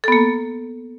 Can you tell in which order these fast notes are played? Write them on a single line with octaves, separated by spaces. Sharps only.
A4 B3 A#3